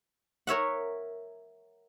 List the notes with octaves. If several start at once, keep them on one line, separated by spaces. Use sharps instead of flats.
A#4 C#5 E5 F#5